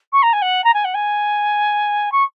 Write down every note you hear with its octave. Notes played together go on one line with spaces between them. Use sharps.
C#6
A#5
G#5
F#5
A#5
G#5
F#5
G#5
C#6